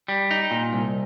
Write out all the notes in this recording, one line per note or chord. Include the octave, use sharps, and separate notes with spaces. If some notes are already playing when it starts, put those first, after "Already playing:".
G3
D#4
A#2
C2